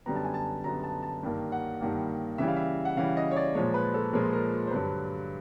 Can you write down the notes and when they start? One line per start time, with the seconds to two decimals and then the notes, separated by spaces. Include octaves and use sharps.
0.06 F#2 D3 G3 B3 A#5
0.16 A5
0.24 G#5
0.34 A5
0.64 F#2 D3 G3 B3 A#5
0.83 A5
1.02 A5
1.23 G2 D#3 G3 A#3
1.52 F#5
1.81 G2 D#3 G3 A#3
2.38 C#3 E3 G3 E5
2.48 F5
2.57 E5
2.85 F#5
2.97 C#3 E3 G3 F5
3.17 D#5
3.31 C#5
3.36 D5
3.55 A#2 F3 G#3 C#5
3.74 B4
3.94 A4
4.13 A#2 F3 G#3 A#4
4.33 A#4
4.67 C5
4.71 G2 D3 F#3 B4